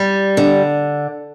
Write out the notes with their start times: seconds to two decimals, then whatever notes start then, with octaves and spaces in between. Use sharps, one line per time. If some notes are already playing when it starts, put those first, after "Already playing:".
Already playing: G3
0.37 D3